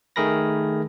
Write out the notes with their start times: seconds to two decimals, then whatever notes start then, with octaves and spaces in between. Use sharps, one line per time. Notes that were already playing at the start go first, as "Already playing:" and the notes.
0.16 D#3 A3 G#4 A#4 B5 A#6